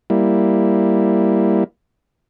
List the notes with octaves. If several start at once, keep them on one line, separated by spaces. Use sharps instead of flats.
G3 A#3 E4